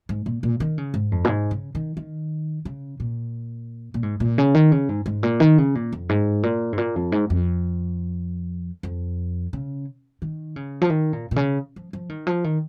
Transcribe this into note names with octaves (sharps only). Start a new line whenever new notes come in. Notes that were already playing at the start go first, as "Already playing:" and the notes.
G#2
A#2
A#2
D#3
C#3
G#2
F2
A#2
G#2
C#3
D#3
D#3
C#3
A#2
A#2
G#2
A#2
C#3
D#3
C#3
G#2
G#2
A#2
D#3
C#3
A#2
F2
G#2
A#2
G#2
A#2
F2
G#2
F2
F2
C#3
D#3
C#3
F3
D#3
A#2
A#2
C#3
F3
F3
D#3
F3
D#3